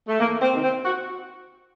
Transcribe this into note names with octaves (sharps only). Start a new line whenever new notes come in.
A3
E2 A#3
C4
C3 D#3
C4
F#4